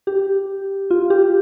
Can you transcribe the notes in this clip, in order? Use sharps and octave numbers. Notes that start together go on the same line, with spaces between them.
G4
F4
G4